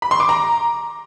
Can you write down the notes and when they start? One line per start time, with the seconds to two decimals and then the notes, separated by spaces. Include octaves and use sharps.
0.02 B5
0.11 C6
0.20 D6
0.29 A#5